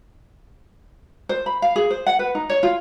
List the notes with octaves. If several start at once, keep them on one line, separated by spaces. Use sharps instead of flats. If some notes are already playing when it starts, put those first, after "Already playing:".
C5
B5
F5
G#4
C5
F#5
B4
D#4
C#5
F4